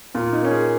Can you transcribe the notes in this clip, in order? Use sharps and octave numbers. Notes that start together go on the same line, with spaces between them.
A#2 F4
D#4
A#3 C#4
G#4